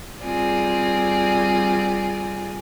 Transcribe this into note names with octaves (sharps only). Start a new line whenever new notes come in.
G3 C4 F4 G#4 D5